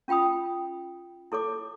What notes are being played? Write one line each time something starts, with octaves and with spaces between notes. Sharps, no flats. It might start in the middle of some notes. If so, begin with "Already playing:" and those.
C#4 F4 G5 B5 D#6
E4 A4 C#5 D6